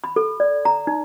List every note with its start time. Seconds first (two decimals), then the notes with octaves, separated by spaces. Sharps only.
0.04 B5
0.16 A4
0.40 D5
0.65 A#5
0.87 D#4